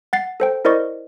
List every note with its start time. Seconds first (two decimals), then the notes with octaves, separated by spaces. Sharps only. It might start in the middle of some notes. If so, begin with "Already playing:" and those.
0.13 F#5 A6 C7
0.40 A4 C5 G5
0.65 E4 A#4 C5 D5 D#5 C#6